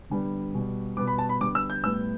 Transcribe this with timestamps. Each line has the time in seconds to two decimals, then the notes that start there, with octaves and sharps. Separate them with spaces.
0.10 D3 G3 B3
0.54 B2 G3 B3
0.97 B2 G3 B3 D6
1.07 B5
1.18 A5
1.29 B5
1.40 D3 G3 B3 D6
1.55 E6
1.70 G6
1.84 A2 G3 B3 E6